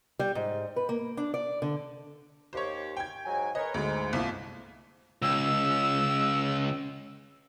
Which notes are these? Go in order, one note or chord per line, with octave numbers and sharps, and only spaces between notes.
G3
G#2
B4
A#3
D4
D5
D3
D#2 G4 C5 C#5
G5 G#6
G#2 F#3 G#5
A#4 B4 C#5 D#5
D2 G#2 G#3
C2 F3 A#3
C#2 E6